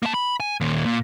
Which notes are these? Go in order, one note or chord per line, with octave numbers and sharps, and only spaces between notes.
A#3 A5
B5
G#5
D#2 A#2
A#2